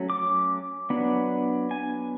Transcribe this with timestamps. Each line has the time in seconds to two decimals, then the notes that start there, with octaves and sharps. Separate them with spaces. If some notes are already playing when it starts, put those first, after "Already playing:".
Already playing: F#3 A3 C#4
0.10 D6
0.90 F#3 B3 D4
1.71 G#5